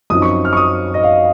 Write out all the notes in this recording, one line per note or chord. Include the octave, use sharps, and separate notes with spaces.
F#2 F3 C4 D#4 D#6
C#6
F6
C#6
D#6
D#5
F5